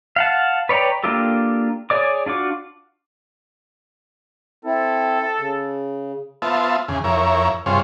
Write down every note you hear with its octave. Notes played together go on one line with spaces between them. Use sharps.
F5 F#5 A5
B4 C#5 D5 G5 A#5
A#3 D4 F4 G4 A4
G#4 C#5 D5 D6
D4 F4 F#4 D6
C4 E4 A4
C#3
B3 F4 C5 E5 A5
E2 C#3 G#4
F2 E4 A#4 C#5
G2 C3 F4 G#4 C5 C#5